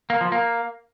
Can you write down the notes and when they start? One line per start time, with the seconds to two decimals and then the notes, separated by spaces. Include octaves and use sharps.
0.10 A#3
0.21 F3
0.32 A#3